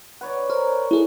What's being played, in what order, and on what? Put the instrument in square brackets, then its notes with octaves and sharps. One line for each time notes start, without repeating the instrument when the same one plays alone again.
[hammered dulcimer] B4 C#5 D5 [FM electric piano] F#5
[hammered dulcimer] A#4 [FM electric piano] C5
[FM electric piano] E4 G#4 A4